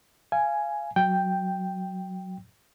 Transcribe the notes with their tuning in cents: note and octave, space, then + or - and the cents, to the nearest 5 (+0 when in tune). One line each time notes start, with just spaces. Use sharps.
F5 -25 G#5 +5
F#3 +0 G5 +0